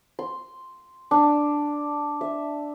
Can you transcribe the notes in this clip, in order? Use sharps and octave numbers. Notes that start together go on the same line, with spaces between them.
C6
D4
E5